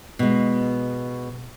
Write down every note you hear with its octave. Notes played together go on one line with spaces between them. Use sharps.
B2 G#3